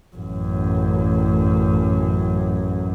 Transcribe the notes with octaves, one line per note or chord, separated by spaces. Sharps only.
A1 F#2